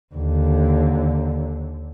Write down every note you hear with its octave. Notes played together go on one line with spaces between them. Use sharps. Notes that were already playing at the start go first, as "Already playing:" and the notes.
D#2 D3